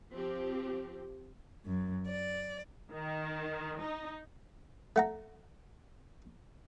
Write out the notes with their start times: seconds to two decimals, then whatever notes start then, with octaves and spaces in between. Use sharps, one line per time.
0.13 F3 C4 G4
1.65 F#2
2.07 D5
2.93 D#3
3.81 D#4
4.96 A3 F#5 A#5